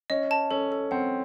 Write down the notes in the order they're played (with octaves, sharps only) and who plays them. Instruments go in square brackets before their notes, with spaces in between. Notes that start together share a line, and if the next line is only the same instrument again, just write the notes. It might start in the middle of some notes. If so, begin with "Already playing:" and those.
[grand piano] C#4 [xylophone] D#5
[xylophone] A5
[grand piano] C#4 [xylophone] A4
[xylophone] A4
[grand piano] C4 [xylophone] F#5